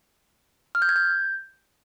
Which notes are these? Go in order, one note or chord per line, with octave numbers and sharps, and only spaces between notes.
F6
G6
G#6
G6